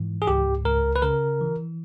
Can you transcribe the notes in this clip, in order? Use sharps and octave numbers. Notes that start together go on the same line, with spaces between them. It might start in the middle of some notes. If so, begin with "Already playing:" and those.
Already playing: G#2 E3
G#4
C#2 G4
C#2 A#4
B4
C#3 A#4
E3